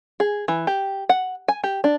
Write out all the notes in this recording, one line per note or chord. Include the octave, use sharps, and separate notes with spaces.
G#4
E3
G4
F#5
G#5
G4
D4